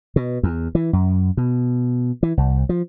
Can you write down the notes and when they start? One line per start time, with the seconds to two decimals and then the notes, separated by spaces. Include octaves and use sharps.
0.16 B2
0.43 E2
0.75 E3
0.93 F#2
1.37 B2
2.23 E3
2.37 C2
2.69 F3